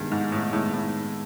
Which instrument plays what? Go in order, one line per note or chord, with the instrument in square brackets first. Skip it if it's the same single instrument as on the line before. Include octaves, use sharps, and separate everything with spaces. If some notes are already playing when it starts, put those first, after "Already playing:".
Already playing: [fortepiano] G2 [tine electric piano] D#3 G#3 B3 D#4 G#4
[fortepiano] G#2
A2
[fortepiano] A2 [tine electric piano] D#3 G#3 B3 D#4 G#4
[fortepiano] A2